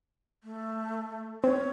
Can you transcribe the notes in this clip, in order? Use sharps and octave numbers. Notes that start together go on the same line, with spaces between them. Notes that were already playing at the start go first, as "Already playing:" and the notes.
A3
C4 C#5